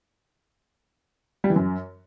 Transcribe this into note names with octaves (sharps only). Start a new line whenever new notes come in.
G3
E3
F#2